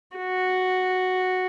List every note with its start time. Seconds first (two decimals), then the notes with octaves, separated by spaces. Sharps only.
0.17 F#4